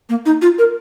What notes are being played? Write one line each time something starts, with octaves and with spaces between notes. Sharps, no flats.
A#3
D#4
F4
A#4